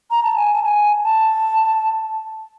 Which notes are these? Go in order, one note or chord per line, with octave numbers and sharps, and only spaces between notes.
A#5
A5
G#5
A5
G#5
A5